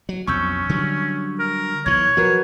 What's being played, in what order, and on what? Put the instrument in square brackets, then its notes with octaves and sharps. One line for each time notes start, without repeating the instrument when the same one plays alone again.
[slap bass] F#3
[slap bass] B1 F2 [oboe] C#4 [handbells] C#6 E6 G6
[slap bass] D3 F#3 G3
[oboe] A#4
[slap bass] B1 E3 [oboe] C#5 [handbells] G#6
[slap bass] F3 F#3 [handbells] F#4 A#4 B4